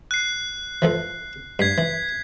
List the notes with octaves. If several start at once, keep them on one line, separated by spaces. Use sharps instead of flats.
F#6 C7
E3 F3 A4
G2 G#6 B6 C7
E3